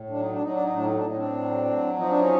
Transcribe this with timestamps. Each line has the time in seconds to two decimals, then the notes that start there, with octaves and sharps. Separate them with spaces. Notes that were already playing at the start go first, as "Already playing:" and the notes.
Already playing: A2
0.10 F#3 D4
0.20 D#4
0.32 D4
0.41 F#3 D#4
0.52 D4
0.64 D#4
0.72 A2 D4
0.85 D#4
0.95 D4
1.03 A2 D#4
1.16 C4 D4
1.34 F#3
1.65 F#3
1.96 F3 D#4
2.09 D4
2.19 C#4 D#4